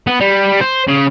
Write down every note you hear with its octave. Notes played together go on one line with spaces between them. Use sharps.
B3
G3
C5
C#3